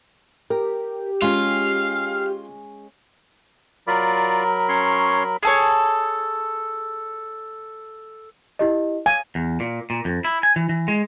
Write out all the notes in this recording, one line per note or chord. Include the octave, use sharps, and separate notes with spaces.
G4 A#4
G#3 C#4 F4 F5 G5
F#3 F4 A#4 D5 B5
C#4 C#5 C6
G#4 A4 C#5
E4 G4 D#5
F5 G#5
E2
A#2
A#2
F2
E4
G#5
E3
E3
G#3